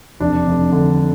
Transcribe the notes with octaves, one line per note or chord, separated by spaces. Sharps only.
F1 D4
F1
D3